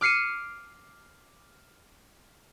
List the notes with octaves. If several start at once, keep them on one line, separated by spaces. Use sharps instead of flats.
D6 F6 C7 C#7 D#7